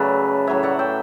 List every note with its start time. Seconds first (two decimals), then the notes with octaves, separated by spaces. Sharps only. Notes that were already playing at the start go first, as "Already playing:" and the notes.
Already playing: C#3 F#3 A3 B4 D5
0.47 A2 F#3 A3 C#5 E5
0.63 D5 F#5
0.79 E5 G5